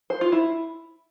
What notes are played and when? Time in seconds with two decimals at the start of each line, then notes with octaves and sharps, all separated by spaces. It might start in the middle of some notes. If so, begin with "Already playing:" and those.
0.10 C5
0.21 F4
0.32 E4